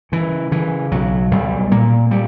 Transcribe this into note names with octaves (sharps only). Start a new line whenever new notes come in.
C#3 E3
C#3 E3
B1 F#3
B1 G3
A#2 A#3
A#2 G3